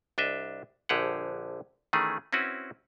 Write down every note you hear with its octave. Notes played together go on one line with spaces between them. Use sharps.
C2 D4 D#5 E5
A#1 D3 G4 G#4 F#5
D#3 E3 A3 C#4 G#4
C4 C#4 E4 F#4 B4